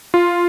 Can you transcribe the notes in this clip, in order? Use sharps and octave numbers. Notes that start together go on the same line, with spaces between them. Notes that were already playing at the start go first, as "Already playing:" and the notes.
F4